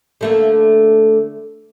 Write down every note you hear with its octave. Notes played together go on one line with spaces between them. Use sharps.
D3 A3 A#3